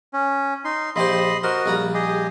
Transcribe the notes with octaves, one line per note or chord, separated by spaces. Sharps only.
C#4
D#4 C6
A#1 G4 C5 D#5 B5 C6
F#4 A#4 C5 D#5
A#1 G3 A#5
G4 G#4 D#5